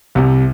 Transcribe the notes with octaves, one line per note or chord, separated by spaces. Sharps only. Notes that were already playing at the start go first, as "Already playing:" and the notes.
C2 C3